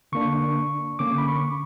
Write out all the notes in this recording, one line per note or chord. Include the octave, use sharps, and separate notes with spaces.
D3 A#3 D4 C#6
D3 A#3 C#4 D6
B5
C#6